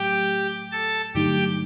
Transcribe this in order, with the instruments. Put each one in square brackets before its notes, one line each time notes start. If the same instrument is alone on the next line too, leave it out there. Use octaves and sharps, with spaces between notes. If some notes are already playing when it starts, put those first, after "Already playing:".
Already playing: [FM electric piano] A2 F#3 A3 [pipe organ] G4 G5
[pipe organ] A4 A5
[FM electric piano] G2 D3 F#3 A3 D#4 [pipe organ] G4 G5